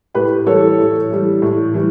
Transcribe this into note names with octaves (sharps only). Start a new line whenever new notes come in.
A2 G4 B4
E3 G3 A4 C#5
A2
E3 G3
A2
E3 G3